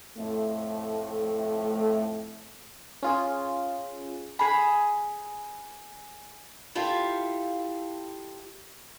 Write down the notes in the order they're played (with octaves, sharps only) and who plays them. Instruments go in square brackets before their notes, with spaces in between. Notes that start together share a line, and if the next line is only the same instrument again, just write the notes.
[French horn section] F2 A2 A3
[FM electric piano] C#4 F4 G#4
[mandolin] G#4 B5
[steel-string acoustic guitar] E4 F4 G4 A4 E5 F5